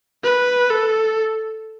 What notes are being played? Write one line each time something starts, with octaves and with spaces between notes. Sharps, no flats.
B4
A4